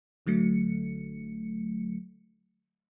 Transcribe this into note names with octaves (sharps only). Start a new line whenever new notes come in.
G1 D3 F#3 A3 C#7